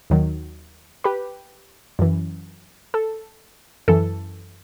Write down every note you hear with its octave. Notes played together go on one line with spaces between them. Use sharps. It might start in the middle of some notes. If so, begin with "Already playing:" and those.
D#2 D#3 F#3
G4 B4
F#2 E3
A4
F#2 E3 A4